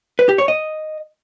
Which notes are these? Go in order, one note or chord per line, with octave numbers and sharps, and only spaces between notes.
B4
G4
C#5
D#5